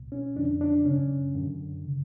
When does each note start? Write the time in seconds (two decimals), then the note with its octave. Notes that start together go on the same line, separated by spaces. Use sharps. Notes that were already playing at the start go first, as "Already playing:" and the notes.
Already playing: C#2 B2
0.12 C#4
0.36 F2 D3 D4
0.61 D4
0.86 F#2 C#3 C#4
1.35 F#2 D3
1.86 C#3